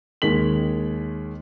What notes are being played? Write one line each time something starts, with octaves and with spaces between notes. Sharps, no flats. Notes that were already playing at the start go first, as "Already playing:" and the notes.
D#2 D#3 G#3 B6 F#7